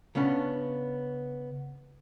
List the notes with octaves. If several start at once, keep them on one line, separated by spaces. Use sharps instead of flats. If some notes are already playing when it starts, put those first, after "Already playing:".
C#3 B3 C#4 D4